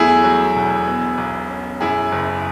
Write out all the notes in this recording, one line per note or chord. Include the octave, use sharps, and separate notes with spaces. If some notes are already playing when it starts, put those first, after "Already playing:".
Already playing: E2 F#3 A3 E4 G#4
F#3
E1
B2
B1
C#4
F#2 E4 G#4
F#1